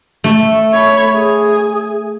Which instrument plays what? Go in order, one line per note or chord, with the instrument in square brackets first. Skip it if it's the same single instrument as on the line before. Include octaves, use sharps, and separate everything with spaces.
[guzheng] A3
[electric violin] C#5 B5
G#4